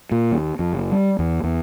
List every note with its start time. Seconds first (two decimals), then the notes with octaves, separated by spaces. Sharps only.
0.11 A#2
0.31 D#2
0.59 F2
0.73 F#1
0.92 G3
1.19 E2
1.43 E2